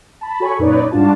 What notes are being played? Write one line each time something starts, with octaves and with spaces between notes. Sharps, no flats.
A5 B5
F#4 A4 C#5 G#5 B5 C#6
F#2 A#2 D#4 B4 C#5 D5
G#2 G3 D4 F4 F#4 A5